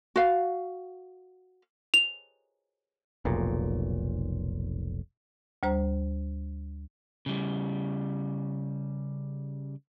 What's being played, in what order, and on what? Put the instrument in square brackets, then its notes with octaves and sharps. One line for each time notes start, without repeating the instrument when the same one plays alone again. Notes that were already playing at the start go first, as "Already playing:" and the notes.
[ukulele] F#4 F5
[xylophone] F7
[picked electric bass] F1 B1 A#2
[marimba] D2 G3 C5 A#5
[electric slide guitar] C#3 G3